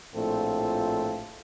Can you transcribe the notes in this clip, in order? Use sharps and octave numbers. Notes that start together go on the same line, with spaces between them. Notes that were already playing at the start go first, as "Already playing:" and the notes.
A#1 A2 A3 C4 F4 A4